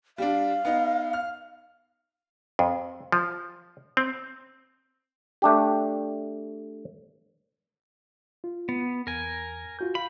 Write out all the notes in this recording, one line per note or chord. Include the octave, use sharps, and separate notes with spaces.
G3 D4 F5
B3 D#4
F6
F2
F3
C4
A3 D4 G4
F4
B3
E2 A#4 G#5
F4 F#4 G6
F5 B5